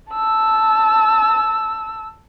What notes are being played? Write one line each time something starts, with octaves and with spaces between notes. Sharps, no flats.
A5 E6